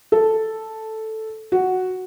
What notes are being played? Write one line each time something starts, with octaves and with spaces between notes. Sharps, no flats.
A4
F#4